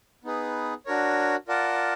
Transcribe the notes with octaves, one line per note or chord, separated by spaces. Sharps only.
B3 D#4 G#4 B4
D4 F#4 A#4 C#5
F4 A#4 D5 F#5 A5